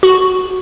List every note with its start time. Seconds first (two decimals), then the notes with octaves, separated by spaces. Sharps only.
0.03 F#4